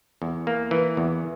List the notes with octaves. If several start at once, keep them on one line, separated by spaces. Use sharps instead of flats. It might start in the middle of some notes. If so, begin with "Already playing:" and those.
E2
A#3
E3
E2